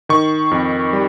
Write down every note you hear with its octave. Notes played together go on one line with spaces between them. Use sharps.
D#3 C#6
F2
G3